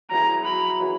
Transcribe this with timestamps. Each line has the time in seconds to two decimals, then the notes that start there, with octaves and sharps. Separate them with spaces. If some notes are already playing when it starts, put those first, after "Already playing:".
0.11 F#3 B3 E4 G#4 A#5
0.45 B5
0.80 F#3 B3 E4 G#4